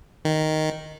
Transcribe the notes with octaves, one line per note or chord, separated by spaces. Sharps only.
D#3